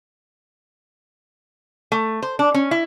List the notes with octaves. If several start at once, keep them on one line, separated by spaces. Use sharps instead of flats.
A3
C5
D4
C#4
E4